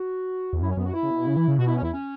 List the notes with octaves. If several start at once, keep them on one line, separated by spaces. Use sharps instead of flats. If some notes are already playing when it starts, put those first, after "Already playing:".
Already playing: F#4
E2
F#2 E4
C#4
F#2 B3
F#4
E4
C#3
B2
C#3
E3
C#3
B2 F#4
E4
C#4
E2 E4
C#4